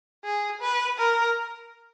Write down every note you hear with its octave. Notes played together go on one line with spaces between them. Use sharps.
G#4
B4
A#4